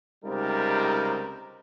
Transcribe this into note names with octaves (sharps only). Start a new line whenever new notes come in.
C#2 C3 G3 D#4 A#4